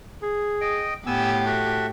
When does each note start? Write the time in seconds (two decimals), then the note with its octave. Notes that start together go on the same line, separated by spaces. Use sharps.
0.23 G#4
0.61 D#5 G5
1.07 A2 B3 G4 G#5 E6
1.46 F#4 A4 E5